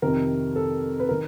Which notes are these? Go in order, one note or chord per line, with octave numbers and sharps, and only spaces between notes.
F2 C3 D#3 A#4
A4
B4
D#3 A#4